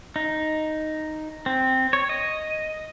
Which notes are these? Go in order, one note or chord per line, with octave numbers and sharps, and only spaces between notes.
D#4
C4
C#5
D#5